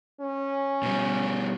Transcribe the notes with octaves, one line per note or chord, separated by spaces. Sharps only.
C#4
B2 G3